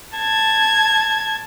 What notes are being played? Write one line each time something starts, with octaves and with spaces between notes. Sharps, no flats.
A5 G#6